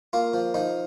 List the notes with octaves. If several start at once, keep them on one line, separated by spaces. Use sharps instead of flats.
A#3 F4
F3
F3 D#4